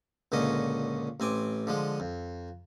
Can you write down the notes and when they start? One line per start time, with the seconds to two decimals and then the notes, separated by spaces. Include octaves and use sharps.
0.32 C#2 A#2 D3 C#4 D#5
1.20 A1 C4 G#5 D6
1.67 D3 F3 G#3
2.00 F2